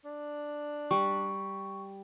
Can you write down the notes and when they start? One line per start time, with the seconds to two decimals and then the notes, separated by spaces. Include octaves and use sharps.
0.05 D4
0.91 G3 C#6